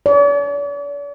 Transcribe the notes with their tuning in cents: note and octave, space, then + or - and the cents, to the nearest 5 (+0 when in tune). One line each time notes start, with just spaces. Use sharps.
D5 -45